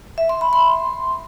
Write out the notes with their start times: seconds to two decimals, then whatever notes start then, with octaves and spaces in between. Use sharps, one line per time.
0.18 E5
0.29 C6
0.41 B5
0.53 C6